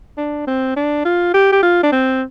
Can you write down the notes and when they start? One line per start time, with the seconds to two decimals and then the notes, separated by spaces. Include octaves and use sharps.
0.17 D4
0.47 C4
0.76 D4
1.05 F4
1.34 G4
1.53 G4
1.63 F4
1.83 D4
1.92 C4